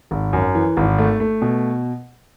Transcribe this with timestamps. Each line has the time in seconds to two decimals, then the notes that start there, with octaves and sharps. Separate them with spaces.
0.11 G#1
0.33 F#2
0.55 E3
0.77 G#1
0.98 A3
1.20 A3
1.42 B2